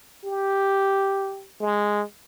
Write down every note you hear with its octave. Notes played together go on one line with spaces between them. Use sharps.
G4
G#3